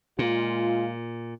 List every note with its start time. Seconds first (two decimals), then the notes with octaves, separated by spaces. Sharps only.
0.19 A#2 G#3 F4